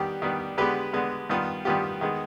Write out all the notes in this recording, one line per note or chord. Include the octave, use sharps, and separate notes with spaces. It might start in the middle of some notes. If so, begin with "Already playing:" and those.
Already playing: D#3 G3 B3 G4
D#3 G3 B3
D3 G#3 B3 G4 B4
D3 G#3 B3
G2 D#3 B3 F4
G2 D#3 B3 F4 G4
D#3 G#3 B3 D#4